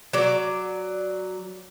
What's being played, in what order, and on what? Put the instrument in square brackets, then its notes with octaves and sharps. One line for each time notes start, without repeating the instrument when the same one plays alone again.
[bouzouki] F#3 D5